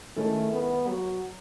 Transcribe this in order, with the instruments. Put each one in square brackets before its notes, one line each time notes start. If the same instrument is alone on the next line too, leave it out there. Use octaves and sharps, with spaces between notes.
[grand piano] D#3 G#3 C#4 E4 A4 [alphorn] A3
[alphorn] B3
F#3